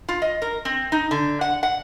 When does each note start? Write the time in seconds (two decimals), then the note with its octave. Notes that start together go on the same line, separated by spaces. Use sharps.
0.09 F4
0.22 D#5
0.42 A#4
0.65 C4
0.92 D#4
1.11 D3
1.41 F#5
1.63 F#5